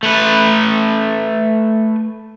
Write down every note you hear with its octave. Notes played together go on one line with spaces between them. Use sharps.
A3 B4